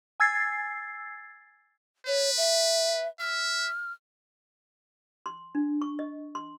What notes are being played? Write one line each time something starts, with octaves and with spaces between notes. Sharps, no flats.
G#5 E6 G#6 A6 C7
B4 C#5
E5
E5 F6
C6
D4
C#6
D#5
C6